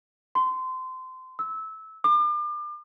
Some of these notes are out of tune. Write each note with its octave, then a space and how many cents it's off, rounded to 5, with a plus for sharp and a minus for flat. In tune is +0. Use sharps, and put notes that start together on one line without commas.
C6 -25
E6 -20
D6 +40